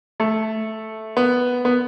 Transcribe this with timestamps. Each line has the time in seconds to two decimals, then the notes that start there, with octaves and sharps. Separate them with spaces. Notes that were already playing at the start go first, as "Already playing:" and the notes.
0.20 A3
1.17 B3
1.65 B3